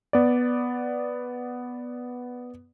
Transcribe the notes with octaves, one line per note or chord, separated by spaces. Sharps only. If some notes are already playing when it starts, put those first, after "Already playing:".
B3 D5